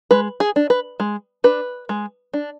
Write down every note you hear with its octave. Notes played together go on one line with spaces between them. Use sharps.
G#3 B4
G#4
D4
B4
G#3
D4 B4
G#3
D4